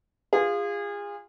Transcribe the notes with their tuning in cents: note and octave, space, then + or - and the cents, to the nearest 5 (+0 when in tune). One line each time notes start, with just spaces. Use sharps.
F4 +0 G#4 -30